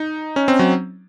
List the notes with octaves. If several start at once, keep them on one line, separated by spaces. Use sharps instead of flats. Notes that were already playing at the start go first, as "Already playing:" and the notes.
Already playing: D#4
C#4
C4
F#3